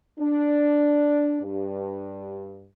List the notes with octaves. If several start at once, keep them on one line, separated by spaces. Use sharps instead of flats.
D4
G2